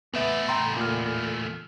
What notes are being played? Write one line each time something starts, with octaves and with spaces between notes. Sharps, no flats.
E2 A3 B3 E5
G5 A#5 C6
A#2 F6